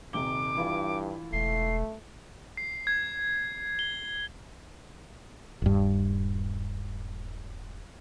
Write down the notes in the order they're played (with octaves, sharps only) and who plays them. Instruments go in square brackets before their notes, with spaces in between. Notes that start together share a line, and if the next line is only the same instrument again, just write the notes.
[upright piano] D#1 C3 G7 [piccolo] D6
[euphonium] G2 [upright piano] E3 E4 F4
[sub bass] E1 [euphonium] A3 [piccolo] C7
[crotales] C7
G#6
G7
[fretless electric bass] D#1 G2